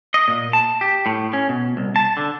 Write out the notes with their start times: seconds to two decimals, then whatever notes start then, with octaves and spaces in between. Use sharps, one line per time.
0.14 D#5
0.28 A#2
0.53 A5
0.81 G4
1.06 A2
1.33 C#4
1.49 B2
1.77 C2
1.96 A5
2.17 D3